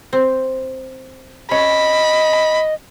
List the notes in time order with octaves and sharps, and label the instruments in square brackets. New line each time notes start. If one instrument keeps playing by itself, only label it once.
[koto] C4
[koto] C#4 [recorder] D#5 [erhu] B5